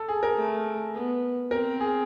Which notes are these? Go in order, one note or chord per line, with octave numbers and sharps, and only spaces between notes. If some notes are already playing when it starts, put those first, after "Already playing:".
Already playing: A4
G#4
A#4
A3
B3
C4 A#4
G#4